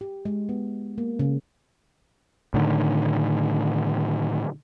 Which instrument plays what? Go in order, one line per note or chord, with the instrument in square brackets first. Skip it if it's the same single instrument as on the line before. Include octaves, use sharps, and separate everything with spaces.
[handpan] G4
G#3
B3
A#3
C#3
[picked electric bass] A2 D3 D#3